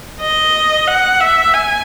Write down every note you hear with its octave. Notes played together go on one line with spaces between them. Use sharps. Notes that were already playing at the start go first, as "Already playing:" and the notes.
D#5
F#5
E5
G#5